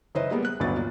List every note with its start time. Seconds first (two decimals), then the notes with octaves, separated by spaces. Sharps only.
0.15 F#1 E4 B4 C5 D#5
0.31 G3 G#3 A#3 B3
0.45 F#6
0.60 A1 D2 G2 F#3 B3 A6
0.76 A#2